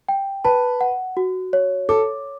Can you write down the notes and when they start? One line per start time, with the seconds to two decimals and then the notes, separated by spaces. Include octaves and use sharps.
0.09 G5
0.44 B4 A5
0.81 F#5
1.17 F#4
1.53 C#5
1.89 A4 D6